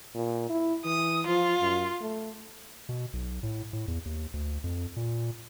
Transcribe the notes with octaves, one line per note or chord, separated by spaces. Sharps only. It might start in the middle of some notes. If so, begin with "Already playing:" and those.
A#2
E4
E3 D#6
F3 F4
F#2
A3
B2
B1
A2
A2
E2
D#2
D2
F2
A#2